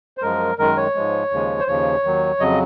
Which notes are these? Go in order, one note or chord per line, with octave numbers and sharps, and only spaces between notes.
C5
F#2 F3 G#3 A#4
F#2 D#3 G#3 A#4
C#5
G#2 F3 G#3
D#2 C#3 F3 G#3
C5
D#2 C#3 F3 C#5
D#2 D#3 F#3
F2 C#3 F#3 D#5